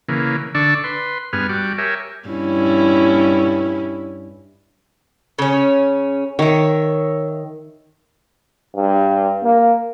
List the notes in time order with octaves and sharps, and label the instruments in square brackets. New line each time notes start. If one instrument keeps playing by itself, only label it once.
[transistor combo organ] C#3 E3 A#3
D3 D4 D5 C#6 E6
B4 C6
G2 B3 G#4 F6
G3 F#4 D6
G4 A#4 C#5 E5 G#5
[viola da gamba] G2 C#4 E4
[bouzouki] C#3 C#4
[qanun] D#3 [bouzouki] C#5 E5
[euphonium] G2
A#3